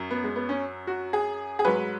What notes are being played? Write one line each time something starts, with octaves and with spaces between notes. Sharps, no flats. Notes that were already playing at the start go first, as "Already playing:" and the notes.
Already playing: F#2 F#3
B3
G#3
B3
C#4
F#4
G#4
G#4
G#2 F#3 B4